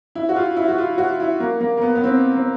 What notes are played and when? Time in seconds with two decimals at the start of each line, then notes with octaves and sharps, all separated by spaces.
0.15 E4
0.29 F#4
0.36 F4
0.57 E4
0.68 F#4
0.78 F4
0.98 F#4
1.20 E4
1.40 A#3
1.61 A#3
1.77 A#3
1.81 B3
1.95 B3
2.04 C4
2.35 C4